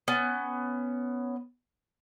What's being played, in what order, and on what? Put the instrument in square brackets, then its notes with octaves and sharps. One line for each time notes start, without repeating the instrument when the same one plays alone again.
[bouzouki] B3 C#4